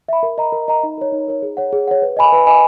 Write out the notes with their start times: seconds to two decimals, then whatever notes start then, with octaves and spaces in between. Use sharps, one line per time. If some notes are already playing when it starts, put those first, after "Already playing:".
0.08 E5 B5
0.23 A#4
0.38 D#5 A#5
0.52 A#4
0.68 D#5 A#5
0.83 D#4
0.98 A#4 C#5
1.12 D#4
1.28 A#4 C#5
1.42 G#4
1.57 C#5 F#5
1.73 G#4
1.88 C#5 F#5
2.02 B4
2.17 D#5 G#5 B5
2.33 B4
2.47 D#5 G#5 B5